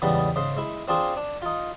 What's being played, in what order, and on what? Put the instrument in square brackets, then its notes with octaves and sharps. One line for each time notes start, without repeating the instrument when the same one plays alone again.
[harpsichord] E2 G#2 C#3 G3 G#3 B3
G#2 C#3 C5
G#3 E4
C4 D4 F4 G#4 C5
D4
D#4 F4